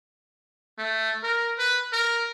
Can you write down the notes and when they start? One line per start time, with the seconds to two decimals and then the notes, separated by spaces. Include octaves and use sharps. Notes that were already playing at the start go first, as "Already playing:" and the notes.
0.78 A3
1.23 A#4
1.59 B4
1.93 A#4